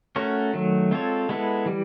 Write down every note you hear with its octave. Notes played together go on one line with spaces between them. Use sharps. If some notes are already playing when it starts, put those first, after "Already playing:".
A3 C#4 F#4 A#4 C#5
D#3 F#3 A3
G#3 C4 F4 A4 C#5
G#3 B3 E4 A4
E3 G3